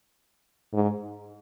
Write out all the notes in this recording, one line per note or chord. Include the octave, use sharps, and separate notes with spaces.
G#2